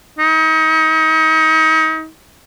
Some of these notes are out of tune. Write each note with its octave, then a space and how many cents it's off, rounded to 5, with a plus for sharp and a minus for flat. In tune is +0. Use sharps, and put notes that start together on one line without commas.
D#4 +35